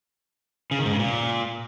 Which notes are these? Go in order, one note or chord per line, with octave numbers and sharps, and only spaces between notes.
C#3
D#3
G#2
C#3
A#2